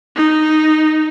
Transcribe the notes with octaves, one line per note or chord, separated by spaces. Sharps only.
D#4